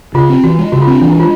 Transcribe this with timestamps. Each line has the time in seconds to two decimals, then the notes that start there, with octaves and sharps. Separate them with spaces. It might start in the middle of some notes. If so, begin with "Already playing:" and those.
0.14 C#3 F4
0.30 C4
0.44 E3 F#4
0.59 G#3
0.72 C#3 F#4
0.82 F4
0.87 C4 D4
1.01 E3 D4
1.10 E4
1.15 G#3 F4